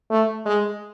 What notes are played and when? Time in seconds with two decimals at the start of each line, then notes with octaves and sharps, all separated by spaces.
0.10 A3
0.46 G#3